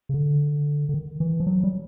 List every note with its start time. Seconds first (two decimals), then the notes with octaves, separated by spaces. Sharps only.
0.09 C#3
0.14 D3
0.89 D3
0.94 D#3
1.20 E3
1.40 F3
1.47 F#3
1.64 G3